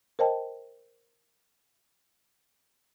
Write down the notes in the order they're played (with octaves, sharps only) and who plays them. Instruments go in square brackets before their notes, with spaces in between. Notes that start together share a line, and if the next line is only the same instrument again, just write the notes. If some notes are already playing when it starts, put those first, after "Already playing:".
[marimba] A#4 C5 D#5 G5 A5